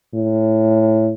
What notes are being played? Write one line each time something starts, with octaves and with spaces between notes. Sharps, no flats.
A2